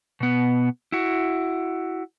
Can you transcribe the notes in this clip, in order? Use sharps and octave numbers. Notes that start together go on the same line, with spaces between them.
B2 B3
E4 F#4